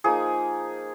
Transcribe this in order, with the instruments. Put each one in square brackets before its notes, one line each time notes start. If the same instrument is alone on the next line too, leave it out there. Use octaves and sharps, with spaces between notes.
[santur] F3 A#3 D#4 G#4